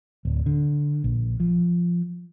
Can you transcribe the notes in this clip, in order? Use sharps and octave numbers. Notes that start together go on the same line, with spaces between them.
D1
D3
A#1
F3